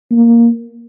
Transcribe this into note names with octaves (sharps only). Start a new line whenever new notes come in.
A#3